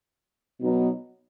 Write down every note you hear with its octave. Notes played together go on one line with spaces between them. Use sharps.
B2 F#3 B3 D#4